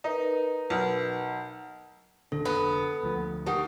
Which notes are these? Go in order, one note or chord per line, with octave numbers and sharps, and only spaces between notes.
D#4 A#4 B4 D#5
B1
D1 D3 D4 A4
F1 D3 B3
D2 F3
D#3 G4 F#5